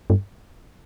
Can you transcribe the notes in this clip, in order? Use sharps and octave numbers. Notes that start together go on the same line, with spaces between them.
G2